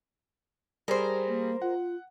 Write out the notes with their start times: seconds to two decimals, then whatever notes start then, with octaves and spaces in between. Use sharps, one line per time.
0.88 G3 G#4 A#4 C5
1.28 A#3
1.62 F4 F#5